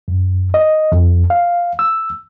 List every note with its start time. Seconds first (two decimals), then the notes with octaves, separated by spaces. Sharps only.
0.08 F#2
0.54 D#5
0.92 F2
1.30 F5
1.79 E6